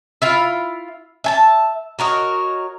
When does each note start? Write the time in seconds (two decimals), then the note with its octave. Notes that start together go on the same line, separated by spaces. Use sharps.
0.22 E4 F4 F5
1.24 E5 G#5 A5
1.99 F#4 A#4 C#5 D#5